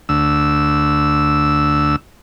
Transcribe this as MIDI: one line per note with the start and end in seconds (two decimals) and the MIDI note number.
0.09 1.96 38
0.09 1.96 88